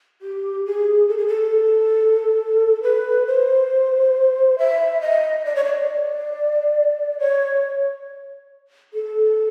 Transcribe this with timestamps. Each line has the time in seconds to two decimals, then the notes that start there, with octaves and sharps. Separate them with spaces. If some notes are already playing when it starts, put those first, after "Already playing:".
0.22 G4
0.65 G#4
1.09 A4
1.18 G#4
1.27 A4
2.83 B4
3.27 C5
4.58 E5
5.01 D#5
5.45 D5
5.55 C#5
5.65 D5
7.19 C#5
8.94 A4